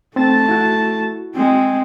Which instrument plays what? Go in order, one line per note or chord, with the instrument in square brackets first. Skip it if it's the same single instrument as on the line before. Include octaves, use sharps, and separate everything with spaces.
[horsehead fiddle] A3 A5 [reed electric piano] C4 A6
[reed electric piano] E4 F#4
[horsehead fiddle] G#3 C4